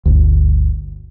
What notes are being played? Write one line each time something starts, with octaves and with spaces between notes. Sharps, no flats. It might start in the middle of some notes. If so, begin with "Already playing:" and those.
G1 D2